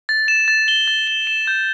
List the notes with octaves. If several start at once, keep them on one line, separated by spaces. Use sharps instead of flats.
A6
E7
A6
G7
A6
G7
E7
G6